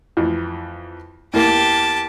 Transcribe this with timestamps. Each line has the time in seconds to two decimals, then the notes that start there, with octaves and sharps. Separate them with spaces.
0.17 F2 E3
1.34 E2 E3 A#3 G4 A5